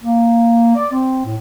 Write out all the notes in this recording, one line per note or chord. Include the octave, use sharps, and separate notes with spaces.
A#3
D5
C4
A2